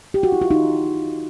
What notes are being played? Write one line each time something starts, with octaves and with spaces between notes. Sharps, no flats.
G4
F#4
E4
F4
D#4